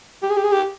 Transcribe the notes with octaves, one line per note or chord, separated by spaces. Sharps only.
G4
G#4
G4
G#4
G4